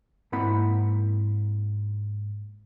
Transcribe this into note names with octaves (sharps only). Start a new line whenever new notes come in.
G#2 A#3 C4 E4 F#5 B5